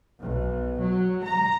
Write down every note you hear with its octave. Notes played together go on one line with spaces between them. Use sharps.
B1
F#3
A#5